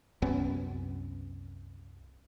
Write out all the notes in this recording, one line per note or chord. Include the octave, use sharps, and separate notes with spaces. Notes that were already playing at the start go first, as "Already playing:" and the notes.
C2 F#2 B3 C#4